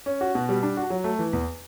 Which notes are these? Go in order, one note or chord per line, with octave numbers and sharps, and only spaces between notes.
C#4
F#4
B2
G3
D4
F#4
F#3
A3
E3
E2